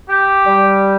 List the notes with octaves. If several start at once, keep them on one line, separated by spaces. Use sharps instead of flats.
G4
G3